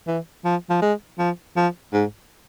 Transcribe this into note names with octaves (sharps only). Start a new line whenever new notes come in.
E3
F3
F3
G#3
F3
F3
G#2